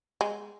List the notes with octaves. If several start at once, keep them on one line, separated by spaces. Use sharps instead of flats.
G#3